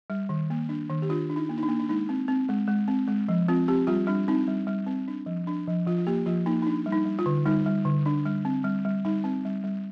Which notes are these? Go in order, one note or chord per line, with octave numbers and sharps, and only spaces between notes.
G3
D#3
A#3
D4
D#3
G4
D4 F4
D4
D#4
A#3
D#4
D4
A#3
D4
G#3 D#4
C4
C4
G#3
G#3
C4
G#3
F3
C4 F4
C4 G4
G3 F4
G3 D4
C4 D#4
G3
G3
C4
D4
F3
D4
F3
F3 F4
F4
A#3 G4
F3 F4
A#3 D#4
D#4
D4
G3
D#4
G3
F4
D3
G3 D#4
G3
D3
D4
G3
C4
G3
G3
G3 D#4
C4
G3
G3